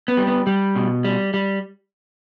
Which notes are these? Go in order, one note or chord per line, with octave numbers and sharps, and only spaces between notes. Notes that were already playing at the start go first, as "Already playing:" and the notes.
B3
G3
B3
G3
B2
G3
G3